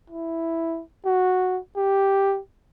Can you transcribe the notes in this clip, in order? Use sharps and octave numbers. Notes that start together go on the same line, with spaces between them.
E4
F#4
G4